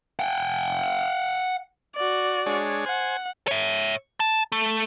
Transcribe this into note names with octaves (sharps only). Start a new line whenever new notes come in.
F#5 G5
F#4 D5
G#3 D4 C#5
C5 F#5 G#5
C#5 E5
A5
A3